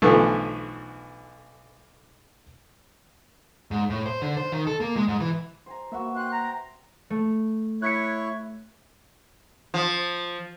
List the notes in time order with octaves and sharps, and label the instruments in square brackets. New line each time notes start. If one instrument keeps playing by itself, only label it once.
[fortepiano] B1 B2 D3 E3 F3 A3
[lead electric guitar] G#2
A2
C5
D3
C5
D#3
A4
A#3
G#3
G#2
E3
[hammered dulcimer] C5 G#5 A#5
[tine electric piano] A#3 [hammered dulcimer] F#4 B4 E5
[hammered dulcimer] F#5 G5 C6 [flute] F#6
[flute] A#5
[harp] A3
[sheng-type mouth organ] E4 C#5 [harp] F#6 B6 C#7
[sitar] F3